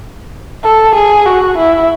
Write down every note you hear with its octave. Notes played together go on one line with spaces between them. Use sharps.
A4
G#4
F#4
E4